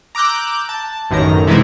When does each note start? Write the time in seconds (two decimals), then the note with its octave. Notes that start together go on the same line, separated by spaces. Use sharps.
0.15 A#5 D6 E6 F#6 G6
0.69 A5
1.10 A1 F#2 D#3 A#5
1.47 C3 E3 G#3 D#4 E4